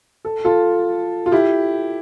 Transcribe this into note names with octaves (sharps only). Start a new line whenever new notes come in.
A4
F4 A4
F4
E4 G4